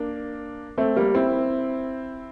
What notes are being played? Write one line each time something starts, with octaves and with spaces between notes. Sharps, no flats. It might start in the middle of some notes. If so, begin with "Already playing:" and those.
Already playing: A#3 D4
A3 C4
G3 A#3
C4 E4